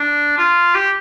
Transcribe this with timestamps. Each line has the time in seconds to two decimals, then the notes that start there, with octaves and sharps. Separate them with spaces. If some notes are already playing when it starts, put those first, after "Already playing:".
Already playing: D4
0.38 F4
0.75 G4